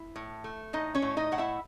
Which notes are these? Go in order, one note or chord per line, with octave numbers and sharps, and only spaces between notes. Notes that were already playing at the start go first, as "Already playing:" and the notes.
Already playing: E4
A2
A3
A2 D#4 D#5
C#4 C#5
A2
D#4 D#5
A2 F#5
E4 E5